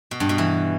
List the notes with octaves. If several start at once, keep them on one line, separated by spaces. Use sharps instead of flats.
B2
G2
B2
E3